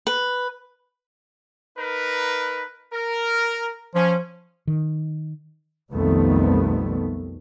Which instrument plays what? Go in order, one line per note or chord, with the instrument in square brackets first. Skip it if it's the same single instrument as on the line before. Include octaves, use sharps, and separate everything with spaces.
[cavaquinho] B4
[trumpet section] D#4 A#4 B4
A#4
[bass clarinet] F3 [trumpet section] C#4
[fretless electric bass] D#3
[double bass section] B1 F2 D#3 G3 A3 B3